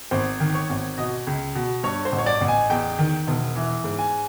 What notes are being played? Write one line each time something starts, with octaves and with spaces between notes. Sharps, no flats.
G#1 C5
D#3
C#5
G#1
B2 D#5
C#2
B2
G2 C#5
C5
A1
C#5
D5
A1
G#5
E2 G5
D#3
E1
E3
G#2
G#5